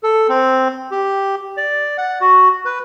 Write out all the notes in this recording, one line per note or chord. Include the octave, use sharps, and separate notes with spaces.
A4
C4
G4
D5
F#5
F#4
B4